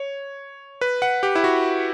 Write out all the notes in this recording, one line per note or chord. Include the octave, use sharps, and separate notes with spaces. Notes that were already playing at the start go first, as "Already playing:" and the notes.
Already playing: C#5
B4
F#5
G4
E4
F#4